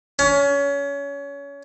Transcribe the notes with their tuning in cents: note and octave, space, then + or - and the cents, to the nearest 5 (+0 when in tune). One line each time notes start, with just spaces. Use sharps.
C#4 +25